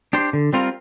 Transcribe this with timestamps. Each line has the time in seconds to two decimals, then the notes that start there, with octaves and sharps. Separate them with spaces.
0.13 D4 G4 C5
0.33 D3
0.53 G3 C4 F4 A#4